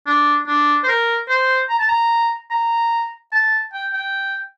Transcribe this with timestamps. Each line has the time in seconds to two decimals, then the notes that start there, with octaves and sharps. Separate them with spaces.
0.06 D4
0.47 D4
0.83 C5
0.88 A#4
1.29 C5
1.69 A#5
1.79 A5
1.88 A#5
2.51 A#5
3.32 A5
3.73 G5
3.93 G5